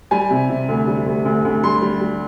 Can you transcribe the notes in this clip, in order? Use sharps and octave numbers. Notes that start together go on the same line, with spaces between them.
G3 G#5
C3
C3
D2
G3
D2
D2
D2
G3 C6
G3
G3